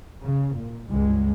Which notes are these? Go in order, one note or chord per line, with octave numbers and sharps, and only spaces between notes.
C#3
A#2
C#2 G2 G#3